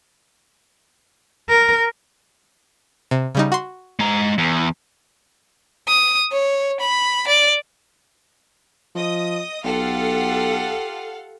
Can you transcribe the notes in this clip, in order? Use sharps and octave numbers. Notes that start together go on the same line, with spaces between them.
A#4
C3
C#3 G3 D#4
F#4 C6
G#3 A#5
E2
D#6
C#5
B5
D5
F3 D#5 D#6
B1 F4 G4 A4 F5 F#5